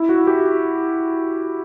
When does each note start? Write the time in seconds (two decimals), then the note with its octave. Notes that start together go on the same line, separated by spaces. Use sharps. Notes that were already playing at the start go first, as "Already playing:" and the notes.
Already playing: E4
0.09 F#4
0.27 G4